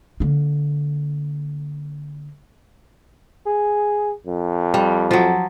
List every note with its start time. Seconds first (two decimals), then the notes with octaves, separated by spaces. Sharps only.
0.20 D3 A#3
3.46 G#4
4.26 F2
4.74 G3
5.11 F3 F#3